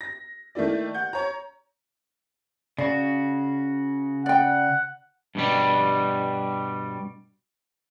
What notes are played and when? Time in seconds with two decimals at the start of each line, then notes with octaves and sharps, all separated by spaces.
0.01 A#6
0.55 D#3 A3 A#3 E4 D5
0.94 F#5 G6
1.13 C#5 A#5
2.78 C#3 F#4 D5
4.26 D5 F#5 G5
5.35 G2 B2 G3